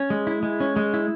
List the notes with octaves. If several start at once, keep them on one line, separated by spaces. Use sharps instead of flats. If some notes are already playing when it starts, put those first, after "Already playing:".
Already playing: C#4
G#3
E4
G#3
C#4
G#3
E4